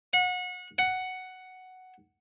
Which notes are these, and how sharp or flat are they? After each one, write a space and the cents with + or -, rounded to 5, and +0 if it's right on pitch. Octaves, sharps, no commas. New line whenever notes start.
F#5 -30
F#5 +5